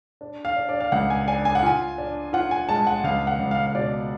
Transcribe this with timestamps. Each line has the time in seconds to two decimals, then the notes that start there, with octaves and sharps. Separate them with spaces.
0.21 D4
0.45 F5
0.56 D4
0.69 D5
0.80 F5
0.92 C#2 F#5
1.10 G#5
1.27 D4 G#5
1.45 G#5
1.55 F#5
1.63 F4 G#5
1.98 D4
2.33 F4 F#5
2.51 G#5
2.69 G#3 A5
2.87 F#5
3.04 C#2 F5
3.27 F#5
3.39 C#2
3.51 F5
3.66 F5
3.75 B2 D5